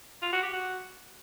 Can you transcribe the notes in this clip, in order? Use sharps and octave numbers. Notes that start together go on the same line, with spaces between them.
F4
F#4
G4
F#4